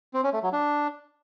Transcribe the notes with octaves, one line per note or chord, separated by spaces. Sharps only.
C4
C#4
A3
F#3
D4